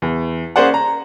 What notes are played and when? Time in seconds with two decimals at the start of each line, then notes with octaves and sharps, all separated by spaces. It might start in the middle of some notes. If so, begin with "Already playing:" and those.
0.02 E2
0.56 A#3 C#4 G#4 C5 D5 F#5
0.74 A#5